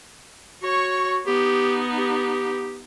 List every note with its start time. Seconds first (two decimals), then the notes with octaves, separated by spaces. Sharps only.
0.63 F#4 C#5 C#6
1.27 B3 D#4 G4
1.98 G4